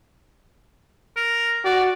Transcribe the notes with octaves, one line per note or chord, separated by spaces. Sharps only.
A#4
F#4 D5